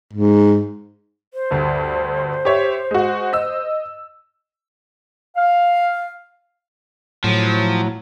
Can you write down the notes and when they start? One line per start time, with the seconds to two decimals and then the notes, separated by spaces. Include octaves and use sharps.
0.14 G#2
1.34 C5
1.51 D2 G2
2.45 G4 C#5 E5
2.91 G#3 F#4
3.33 D#5 E6
5.36 F5
7.24 A2 F3 F#3